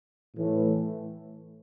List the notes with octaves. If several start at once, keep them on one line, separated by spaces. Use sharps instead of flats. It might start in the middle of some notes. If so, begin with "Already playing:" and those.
A2 E3 A3